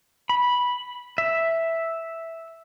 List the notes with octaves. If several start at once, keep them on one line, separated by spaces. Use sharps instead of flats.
B5
E5